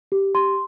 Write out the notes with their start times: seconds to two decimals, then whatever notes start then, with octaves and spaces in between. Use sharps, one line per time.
0.12 G4
0.35 G4 C6